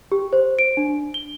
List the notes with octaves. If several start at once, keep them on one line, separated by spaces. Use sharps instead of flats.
G4
C5
D7
D4
G7